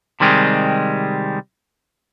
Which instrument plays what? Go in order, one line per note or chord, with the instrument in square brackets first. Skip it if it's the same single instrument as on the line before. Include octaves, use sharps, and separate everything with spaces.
[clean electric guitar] C3 D#3 G3 G#3 C4